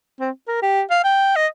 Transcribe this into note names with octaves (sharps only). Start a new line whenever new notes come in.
C4
A#4
G4
F5
G5
D#5